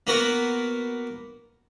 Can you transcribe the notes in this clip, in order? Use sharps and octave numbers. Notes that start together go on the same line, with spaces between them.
A#3 B3 F#4 A#4